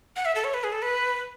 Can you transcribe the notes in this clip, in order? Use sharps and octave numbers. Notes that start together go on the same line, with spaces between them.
F#5
E5
A4
C#5
B4
G#4
A4
B4